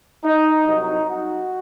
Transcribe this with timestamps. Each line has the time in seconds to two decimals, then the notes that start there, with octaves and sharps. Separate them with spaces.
0.24 D#4
0.67 C2 C3 F#3 D#4
1.10 F#4